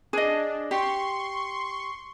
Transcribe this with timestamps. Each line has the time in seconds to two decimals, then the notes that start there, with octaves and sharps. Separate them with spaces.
0.13 D4 G#4 D#5
0.71 G4 C6 C#6